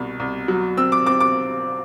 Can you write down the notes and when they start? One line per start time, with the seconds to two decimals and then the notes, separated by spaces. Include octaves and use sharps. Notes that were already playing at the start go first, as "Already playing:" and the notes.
Already playing: C2 B2
0.20 C2
0.48 F#3
0.77 C4 E6
0.92 D6
1.06 C4 D6
1.20 D6